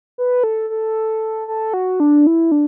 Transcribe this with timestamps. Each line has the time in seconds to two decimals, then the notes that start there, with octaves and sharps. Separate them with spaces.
0.18 B4
0.44 A4
0.70 A4
1.48 A4
1.74 F#4
2.00 D4
2.27 E4
2.52 D4